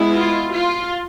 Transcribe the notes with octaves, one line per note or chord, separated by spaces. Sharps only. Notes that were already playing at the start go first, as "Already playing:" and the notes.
Already playing: G#3 B3 E4
F4
F4